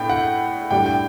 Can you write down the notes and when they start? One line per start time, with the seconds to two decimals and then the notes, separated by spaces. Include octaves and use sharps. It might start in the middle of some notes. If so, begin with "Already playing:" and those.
Already playing: A2 B3 D4 G5
0.10 F#5
0.71 A2 G3 D4 G5
0.86 G5